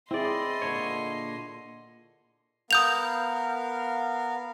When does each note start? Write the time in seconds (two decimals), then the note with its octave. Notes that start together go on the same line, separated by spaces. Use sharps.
0.11 C4 E4 G#4 D5 D#5 C6
0.62 A#2 D3 C#5
2.71 B3 A#4 F5 D#6 G6 F7